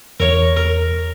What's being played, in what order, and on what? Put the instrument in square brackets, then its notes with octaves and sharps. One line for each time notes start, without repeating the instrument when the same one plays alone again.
[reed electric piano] E2 [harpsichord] A#4 C#5
[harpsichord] A#4